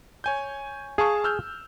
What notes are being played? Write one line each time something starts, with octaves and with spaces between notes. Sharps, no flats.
C#5 G#5 G6
G#4 F5 A5 C#6
E6 F6 G6